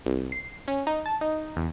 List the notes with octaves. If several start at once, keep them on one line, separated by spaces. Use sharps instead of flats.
C2
C7
C#4
D#4
A5
D#4
E2